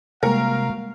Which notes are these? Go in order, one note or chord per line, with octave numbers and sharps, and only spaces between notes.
C3 G3 G#3 A#3 F#4 A#4 F5